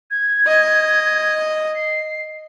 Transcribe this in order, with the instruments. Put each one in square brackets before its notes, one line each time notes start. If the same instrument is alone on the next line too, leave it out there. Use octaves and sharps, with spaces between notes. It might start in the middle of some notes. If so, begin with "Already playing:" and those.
[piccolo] G#6
[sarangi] D#5
[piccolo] C7